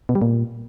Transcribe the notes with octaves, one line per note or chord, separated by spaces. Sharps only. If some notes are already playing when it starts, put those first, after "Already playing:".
B2
G3
A#2